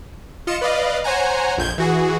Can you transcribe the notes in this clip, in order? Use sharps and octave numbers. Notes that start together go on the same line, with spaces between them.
F4 D#5 C#7 E7
B4 D5 D#5 F5
C5 C#5 F#5 G#5 A#5
A#1 F2 G6 G#6
E3 F#4 G#4